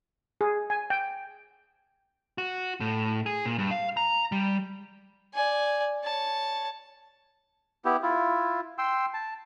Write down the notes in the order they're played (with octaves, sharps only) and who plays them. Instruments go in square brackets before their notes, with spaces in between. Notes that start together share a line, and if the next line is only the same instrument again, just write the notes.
[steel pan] G#4
G#5
G5
[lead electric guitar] F#4
A2
G#4
A#2
G2
F5
A#5
G3
[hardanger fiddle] D5 G#5
C#5 A5
[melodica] B3 E4 G4
E4 F4
G5 C6 E6
A5